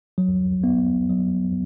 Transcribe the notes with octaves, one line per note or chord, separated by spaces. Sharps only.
F#3
B3
F#3